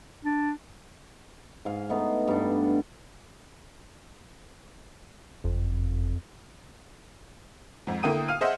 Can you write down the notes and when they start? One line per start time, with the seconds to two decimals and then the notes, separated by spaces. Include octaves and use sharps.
0.25 D4
1.65 G#2 F5
1.89 A3 B3 D#4
2.28 G2 D4
5.44 F#1 F2
7.87 F2 G#2
8.03 D3 A#3 E4 G5 D#6 D#7
8.28 F5 F6 D#7
8.41 G#4 C5 D#5 E5 F#5